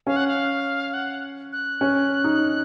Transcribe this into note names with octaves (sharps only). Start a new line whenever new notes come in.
C#4 F5
F#5
F5
F#5
F#6
C#4
D#4